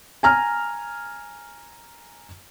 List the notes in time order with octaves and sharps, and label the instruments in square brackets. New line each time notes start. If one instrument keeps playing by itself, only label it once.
[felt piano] G#5 A#5 F6